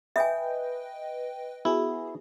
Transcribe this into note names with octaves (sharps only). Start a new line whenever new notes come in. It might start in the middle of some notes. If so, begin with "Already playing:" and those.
B4 D#5 E5 G5 G#5
B3 E4 F#4 G#4